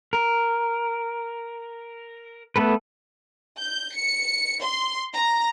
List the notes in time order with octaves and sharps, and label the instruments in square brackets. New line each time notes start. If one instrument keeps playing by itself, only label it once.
[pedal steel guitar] A#4
A3 B3 A4 B4
[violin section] G6
C#7
C6
A#5